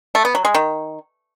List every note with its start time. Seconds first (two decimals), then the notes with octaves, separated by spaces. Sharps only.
0.15 A3
0.25 B3
0.35 F#3
0.45 G#3
0.54 D#3